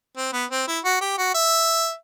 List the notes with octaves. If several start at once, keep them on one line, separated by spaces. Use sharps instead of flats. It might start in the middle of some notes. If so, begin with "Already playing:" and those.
C4
B3
C4
E4
F#4
G4
F#4
E5